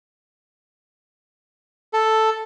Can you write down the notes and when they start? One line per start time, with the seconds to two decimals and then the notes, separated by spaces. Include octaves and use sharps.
1.93 A4